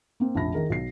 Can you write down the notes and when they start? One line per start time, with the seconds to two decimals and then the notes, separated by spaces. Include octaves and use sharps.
0.20 A#3 C4
0.35 F1 A#1 A5 B5 A#6
0.54 D#3 G#4 A#4
0.70 B1 C7